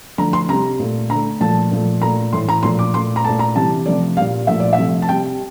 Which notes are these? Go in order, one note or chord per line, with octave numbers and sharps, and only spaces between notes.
D3 F3 A3 A#5
C6
C3 G3 A#5
A#2 A3
D3 A#5
A3
A#2 F3 A3 A5
A#2 F3 A3
A#2 A3 A#5
A2 E3 A3 C6
A#5
A#2 F3 A3 C6
D6
A#2 A3 C6
A#5
A#2 A3 A5
A#5
C3 E3 G3 A5
C3 F3 A3 D5
A#2 G3 F5
A#2 F3 A3 E5
D5
E5
C3 F3 A3
A5
C3 G3 G5